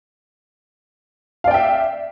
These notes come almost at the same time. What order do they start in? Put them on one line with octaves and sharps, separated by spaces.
F5 D5 G5 E5